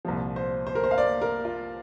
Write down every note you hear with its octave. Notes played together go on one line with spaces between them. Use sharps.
C2 A#2 F3
C5
C5
A#4
C5
F5
D5
A#4
F4